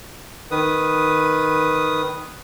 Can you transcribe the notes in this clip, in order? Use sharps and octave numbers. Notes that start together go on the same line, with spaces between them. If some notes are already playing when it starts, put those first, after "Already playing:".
D#3 B4 D#6